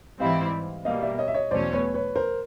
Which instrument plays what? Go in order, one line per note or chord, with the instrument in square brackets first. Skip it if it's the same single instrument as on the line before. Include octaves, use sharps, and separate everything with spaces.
[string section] G#2 E3 G3 C4 E4 [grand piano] D#5 F5
[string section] B2 G3 A#3 [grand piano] D#5 F5
[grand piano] D5 E5
C#5 D#5
E5
C#5 D#5
[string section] E2 B2 F#3 A3 C#4 [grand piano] C5 D5
[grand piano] B4 C#5
B4 C#5
A#4 C5